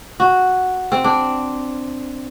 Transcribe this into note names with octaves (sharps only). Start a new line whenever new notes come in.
F#4
C4
D4